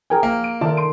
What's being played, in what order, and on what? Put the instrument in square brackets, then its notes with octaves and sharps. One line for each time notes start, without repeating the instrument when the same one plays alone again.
[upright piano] F3 G5 [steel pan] G#4 A#4 G#5
[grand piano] A#3
[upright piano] D7
[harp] D#3 [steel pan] F4 A4 [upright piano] D5 E5 A5
[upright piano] C6 D7